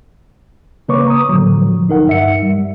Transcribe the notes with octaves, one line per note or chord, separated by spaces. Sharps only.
C#3 A#3 B4 C#5 C#6 D6
A#5 D#6
A2 D3 F3 F#3
C#2 D#4 A#4 F#5
G2 E5 C#7
G3